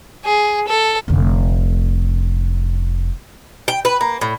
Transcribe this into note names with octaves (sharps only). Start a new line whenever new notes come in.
G#4
A4
F1 D3
G5
B4
A#3
A2